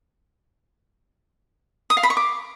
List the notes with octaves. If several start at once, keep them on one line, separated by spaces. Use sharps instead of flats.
D#6
F5
B5
C#6
D6